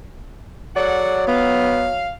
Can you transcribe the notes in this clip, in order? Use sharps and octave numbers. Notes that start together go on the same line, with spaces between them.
F#3 G#4 A4 D5 F#5
B3 F5